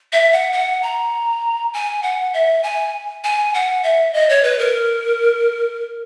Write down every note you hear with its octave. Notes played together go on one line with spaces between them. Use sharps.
E5
F#5
F#5
A#5
G#5
F#5
E5
G#5
G#5
F#5
E5
D#5
C#5
B4
A#4